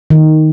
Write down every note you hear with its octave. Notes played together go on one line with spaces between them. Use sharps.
D#3